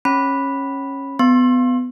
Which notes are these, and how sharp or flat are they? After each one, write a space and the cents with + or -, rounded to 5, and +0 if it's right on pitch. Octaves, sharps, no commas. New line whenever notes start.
C#4 -15 B5 +0
B3 +25 C6 +40